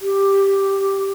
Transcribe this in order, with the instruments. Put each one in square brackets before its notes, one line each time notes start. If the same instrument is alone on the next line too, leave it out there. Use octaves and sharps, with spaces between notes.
[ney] G4